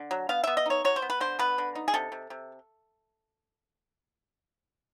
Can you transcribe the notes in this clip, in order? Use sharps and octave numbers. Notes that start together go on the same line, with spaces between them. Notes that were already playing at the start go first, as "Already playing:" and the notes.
Already playing: D3
F#3
B3 F5
B3 E5
D#5
D#4 C#5
F#3 C#5
C5
B3
B4
D3 C5
B3 B4
D3
D#4
G#4
C3 A4
C3
C3